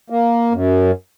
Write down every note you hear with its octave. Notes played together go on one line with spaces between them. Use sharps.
A#3
F#2